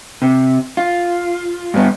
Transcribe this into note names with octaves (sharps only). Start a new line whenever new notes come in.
C3
F4
G2 B3